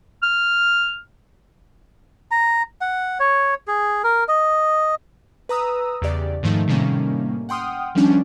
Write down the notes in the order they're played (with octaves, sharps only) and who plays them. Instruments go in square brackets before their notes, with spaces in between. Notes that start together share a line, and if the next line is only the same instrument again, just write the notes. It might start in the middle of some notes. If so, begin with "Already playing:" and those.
[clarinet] F6
[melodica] A#5
F#5
C#5
G#4
A#4
D#5
[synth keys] B4 A#5 D#6 E6
E2 C#3 G4 D5
G#2 D#3 F3 A3 D#4
A2 C3 D#3 G3 A#3 C#4
F#5 G5 C6 D#6 F6
D#3 F3 G3 C#4 D4